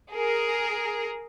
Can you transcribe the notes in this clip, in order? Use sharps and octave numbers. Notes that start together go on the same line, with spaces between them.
G#4 A#4